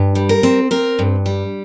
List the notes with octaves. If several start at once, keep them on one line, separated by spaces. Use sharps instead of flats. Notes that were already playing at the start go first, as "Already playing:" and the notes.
Already playing: G2
G3
A#4
C4
C4 A#4
G2
G3